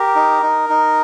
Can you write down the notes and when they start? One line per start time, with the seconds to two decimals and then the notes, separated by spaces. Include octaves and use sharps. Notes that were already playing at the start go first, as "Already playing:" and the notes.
Already playing: G4 A#4
0.16 D#4
0.43 D#4
0.69 D#4